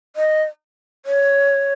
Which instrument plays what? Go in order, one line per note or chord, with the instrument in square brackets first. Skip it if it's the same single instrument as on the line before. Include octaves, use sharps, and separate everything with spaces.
[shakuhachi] D#5
C#5